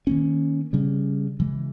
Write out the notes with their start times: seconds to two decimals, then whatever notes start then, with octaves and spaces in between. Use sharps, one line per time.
0.07 D#3 A#3 C#4
0.73 C#3 G3 C#4
1.40 C#3 E3 G#3